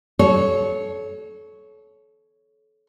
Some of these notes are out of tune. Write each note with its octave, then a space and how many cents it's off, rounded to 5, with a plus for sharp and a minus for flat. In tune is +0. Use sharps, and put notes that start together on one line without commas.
A4 -30 C#5 +0